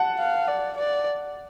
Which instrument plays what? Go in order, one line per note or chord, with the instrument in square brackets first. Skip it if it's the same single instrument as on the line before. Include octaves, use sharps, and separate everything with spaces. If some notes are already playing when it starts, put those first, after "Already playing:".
Already playing: [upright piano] F#5 A5
[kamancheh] F5
D5
D5